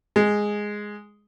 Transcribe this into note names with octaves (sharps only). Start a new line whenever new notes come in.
G#3